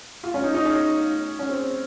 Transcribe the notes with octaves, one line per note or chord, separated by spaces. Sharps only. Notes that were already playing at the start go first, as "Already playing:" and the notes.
F4
C#4
D#4
D#4
C#4
C#4
C4